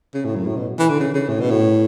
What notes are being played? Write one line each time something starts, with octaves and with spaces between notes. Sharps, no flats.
C#3
A2
F#2
A2
B2
E3
D3
C#3
C#3
A2
B2
A2